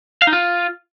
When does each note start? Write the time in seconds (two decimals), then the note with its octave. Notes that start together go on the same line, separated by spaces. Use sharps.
0.22 F5
0.27 D#4
0.33 F4